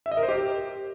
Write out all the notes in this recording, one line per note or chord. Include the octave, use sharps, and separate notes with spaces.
E5
D#5
A#4
C5
G4